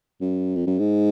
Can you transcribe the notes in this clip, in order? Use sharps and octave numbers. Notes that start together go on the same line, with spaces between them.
F#2
F2
F#2
G#2